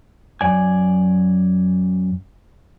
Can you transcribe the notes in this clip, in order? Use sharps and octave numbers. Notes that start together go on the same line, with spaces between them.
F#2 D5 G#5